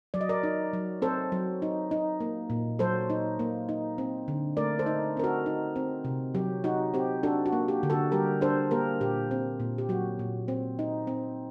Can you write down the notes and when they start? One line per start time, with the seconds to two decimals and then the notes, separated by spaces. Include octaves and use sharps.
0.14 F#3 D5
0.21 D#5
0.29 A#4 D5
0.43 D#4
0.73 F#3
1.02 C4 A4 C5
1.32 F#3
1.62 D#4
1.91 D#4
2.20 A#3
2.50 A#2
2.79 F#3 A4 C5
3.10 D#4
3.39 A#3
3.69 D#4
3.98 C4
4.28 D3
4.57 A3 A#4 D5
4.79 A4 C5
4.86 D#4
5.17 C4 A#4
5.24 F#4 A4
5.46 D#4
5.76 C4
6.05 C3
6.35 F#3 G4
6.64 D#4 F#4
6.94 C4 G4
7.23 D4 F#4 A4
7.46 F#4
7.53 A#3
7.68 G4
7.83 D3
7.90 F#4 A4
8.12 G3 G4 A#4
8.41 D4 A4 C5
8.71 A#3 G4 A#4
9.01 A#2 G4
9.31 C4
9.60 A#2
9.78 G4
9.89 F#3 F#4
10.19 A#2
10.48 C4
10.79 D#4
11.07 C4